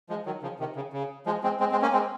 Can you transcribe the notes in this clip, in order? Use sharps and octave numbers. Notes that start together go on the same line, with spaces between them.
F3 G#3
D#3 F#3
C#3 F3
C3 D#3
C#3
C#3
F3 G#3
G#3 C4
G#3 C4
G#3 C4
A#3 C#4
G#3 C4